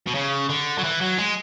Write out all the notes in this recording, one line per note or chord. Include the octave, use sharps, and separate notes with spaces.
B2
C#3
D3
F#3
E3
F#3
G#3